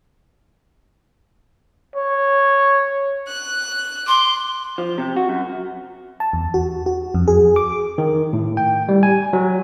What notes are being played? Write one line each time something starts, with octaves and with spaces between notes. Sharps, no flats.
C#5
F#6
C6 D6
F3
C3
F#4
F#2
A5
E2
F#4
F#4
F2
G#4
D6
D#3
A2
G5
G3
G#5
F#3